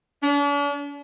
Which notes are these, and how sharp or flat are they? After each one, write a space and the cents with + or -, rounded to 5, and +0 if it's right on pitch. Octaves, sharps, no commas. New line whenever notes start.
D4 -45